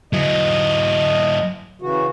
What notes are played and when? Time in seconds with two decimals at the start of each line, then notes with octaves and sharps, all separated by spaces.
0.13 F#3 E4 D#5
1.82 C#3 E3 F#4